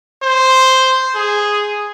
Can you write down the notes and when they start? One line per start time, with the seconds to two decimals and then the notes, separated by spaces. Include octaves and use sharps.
0.24 C5
1.15 G#4